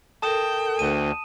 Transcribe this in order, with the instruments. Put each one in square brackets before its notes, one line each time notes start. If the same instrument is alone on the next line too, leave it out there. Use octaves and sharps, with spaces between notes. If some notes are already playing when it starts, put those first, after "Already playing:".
[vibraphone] A4 A#4 [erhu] G5 [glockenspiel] A5 D#6 E7
[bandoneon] D2 [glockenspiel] D#7